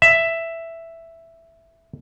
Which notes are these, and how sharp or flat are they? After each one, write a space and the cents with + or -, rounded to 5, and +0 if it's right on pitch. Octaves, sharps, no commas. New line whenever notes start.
E5 +5